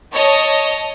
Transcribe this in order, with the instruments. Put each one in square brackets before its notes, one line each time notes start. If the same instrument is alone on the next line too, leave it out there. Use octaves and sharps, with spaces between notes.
[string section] C#5 D#5 A5